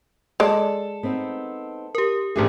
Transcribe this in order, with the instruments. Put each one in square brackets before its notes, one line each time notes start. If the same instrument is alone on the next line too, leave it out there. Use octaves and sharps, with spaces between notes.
[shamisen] G#3 D5 [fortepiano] A4 A5
[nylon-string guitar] B3 C4 D#4
[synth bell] G4 A#4
[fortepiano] A1 G4 G#4 [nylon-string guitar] A3 D4 C5